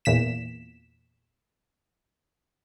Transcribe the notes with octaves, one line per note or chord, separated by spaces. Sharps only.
E2 A#2 B6 E7